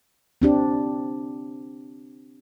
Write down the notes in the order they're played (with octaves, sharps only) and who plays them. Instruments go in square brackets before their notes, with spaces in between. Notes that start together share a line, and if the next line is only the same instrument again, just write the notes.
[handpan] C4 D4 G4